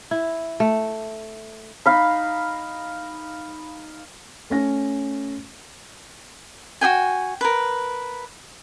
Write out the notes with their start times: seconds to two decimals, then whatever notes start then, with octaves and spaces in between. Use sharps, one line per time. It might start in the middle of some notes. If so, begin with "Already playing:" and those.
0.11 E4
0.60 A3
1.86 D#4 F5 B5
4.50 A3 C#4 A#6
6.81 F#4 G#4 G5 G#5
7.41 A#4 B4